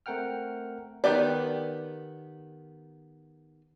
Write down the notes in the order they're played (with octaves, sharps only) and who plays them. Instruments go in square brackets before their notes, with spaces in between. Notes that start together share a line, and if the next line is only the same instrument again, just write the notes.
[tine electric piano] A3 C4 A#4 F#5 G5 F6
[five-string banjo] D#3 E3 B3 G4 D5